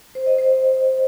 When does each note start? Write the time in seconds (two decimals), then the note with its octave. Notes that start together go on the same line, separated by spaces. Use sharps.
0.15 C5
0.26 D#5
0.38 C5